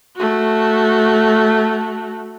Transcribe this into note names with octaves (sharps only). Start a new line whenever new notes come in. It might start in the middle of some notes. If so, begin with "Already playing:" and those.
A3 F#4